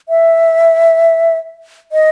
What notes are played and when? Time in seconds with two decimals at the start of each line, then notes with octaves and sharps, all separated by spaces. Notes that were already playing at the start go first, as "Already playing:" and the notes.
0.09 E5
1.92 D#5